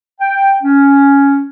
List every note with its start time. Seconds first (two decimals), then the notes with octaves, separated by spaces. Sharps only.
0.21 G5
0.63 C#4